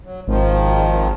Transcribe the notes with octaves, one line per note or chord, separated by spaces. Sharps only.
F#3
G#1 D#3 F3